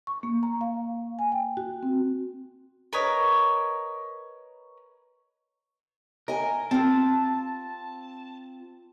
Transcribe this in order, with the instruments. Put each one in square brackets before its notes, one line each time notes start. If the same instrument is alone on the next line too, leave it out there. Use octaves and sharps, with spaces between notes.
[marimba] C#6
A#3
A#5
F5
G#5
G5
F#4
C4
[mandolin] A#4 B4 C#5 D#5
[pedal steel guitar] A#4 [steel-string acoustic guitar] D#5 G#5
[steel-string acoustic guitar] C4 F4 [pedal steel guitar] A5